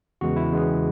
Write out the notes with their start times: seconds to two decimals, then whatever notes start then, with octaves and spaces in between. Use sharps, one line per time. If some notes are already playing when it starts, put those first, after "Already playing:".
0.21 E2 C#3 G#3 B3 F#4
0.36 E4
0.51 E2 C#3 G#3 B3